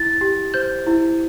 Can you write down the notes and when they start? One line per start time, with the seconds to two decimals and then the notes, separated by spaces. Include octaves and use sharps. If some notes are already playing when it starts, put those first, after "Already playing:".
Already playing: E4 A6
0.21 G4
0.54 C5 G6
0.87 E4